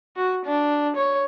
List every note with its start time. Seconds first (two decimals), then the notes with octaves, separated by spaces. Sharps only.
0.16 F#4
0.45 D4
0.96 C#5